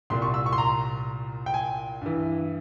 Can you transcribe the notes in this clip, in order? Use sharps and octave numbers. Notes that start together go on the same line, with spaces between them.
C2 A#2 C6
C#6
E6
C#6
C6
A#5
G5
G#5
G2 E3